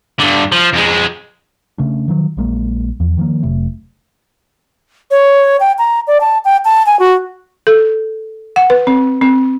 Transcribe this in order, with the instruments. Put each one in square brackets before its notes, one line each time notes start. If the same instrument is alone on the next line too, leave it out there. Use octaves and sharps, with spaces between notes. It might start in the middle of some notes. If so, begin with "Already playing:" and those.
[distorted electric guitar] G2 D3
F3
F2 G#3
[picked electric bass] C#3 A3 C#4 D4
D#3 F3 F#3
A#1 F#3 G#3 A#3
E2 F3
D#3 F3 A#3
F1 C3 F#3 A3
[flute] C#5
G5
A#5
D5
A5
G5
A5
G#5
F#4
[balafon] A4
F#5
B4
C4
C4